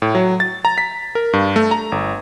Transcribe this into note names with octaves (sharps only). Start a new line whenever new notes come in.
A2
F#3
A6
A#5
B6
A#4
G2
A3
A#5
G1